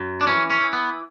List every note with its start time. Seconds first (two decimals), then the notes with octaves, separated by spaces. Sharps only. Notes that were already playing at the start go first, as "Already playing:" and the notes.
Already playing: F#2
0.21 D4
0.27 E3 C#4
0.50 C#4
0.61 E3
0.73 B3